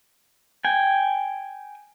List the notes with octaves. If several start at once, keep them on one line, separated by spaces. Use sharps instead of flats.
G5 G#5